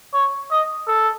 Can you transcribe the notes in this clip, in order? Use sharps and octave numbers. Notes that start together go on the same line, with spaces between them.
C#5
D#5
A4